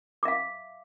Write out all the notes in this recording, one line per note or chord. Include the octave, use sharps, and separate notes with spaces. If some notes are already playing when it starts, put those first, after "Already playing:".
E5 F5 D6